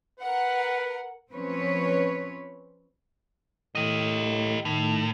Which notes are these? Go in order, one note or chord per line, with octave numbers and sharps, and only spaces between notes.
A#4 B4 F#5
F3 C4 C#4 B4 C#5
A2 G4 D#5
A2 D#3